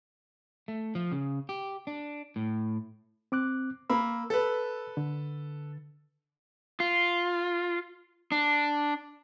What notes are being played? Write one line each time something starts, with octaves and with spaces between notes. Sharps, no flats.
A3
F3
C#3
G4
D4
A2
C4 D6 F#6
A#3 B5 E6
A4 B4
D3
F4
D4